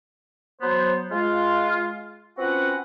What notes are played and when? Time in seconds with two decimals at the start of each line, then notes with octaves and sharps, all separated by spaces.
0.61 F#3 B3 C5
1.11 G#3 F4
2.38 C4 C#4 F4 F#4 B4 F#5